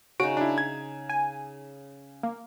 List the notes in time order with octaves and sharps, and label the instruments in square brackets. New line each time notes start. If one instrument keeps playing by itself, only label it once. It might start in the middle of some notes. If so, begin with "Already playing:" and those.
[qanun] C#3 D#4 [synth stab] F#4 [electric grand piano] D7
[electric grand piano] D4 E4
G#6
[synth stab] G#5
A#3